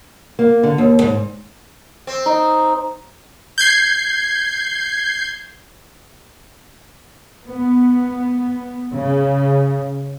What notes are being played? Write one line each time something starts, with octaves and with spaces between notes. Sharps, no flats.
A#3
D3
D#2
G#2
C4
D#4
G6 G#6 C7
B3
C#3